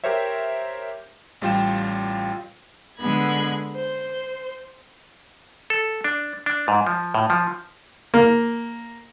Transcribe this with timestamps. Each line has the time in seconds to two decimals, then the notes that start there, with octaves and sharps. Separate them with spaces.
0.04 G4 A#4 C5 C#5 E5
1.42 A1 G3 F4 G5 E7
2.99 D3 G#3 B3 B5 G#6
3.75 C5
5.70 A4
6.04 D4
6.46 D4
6.68 G#2
6.87 F3
7.15 A2
7.30 F3
8.14 A#3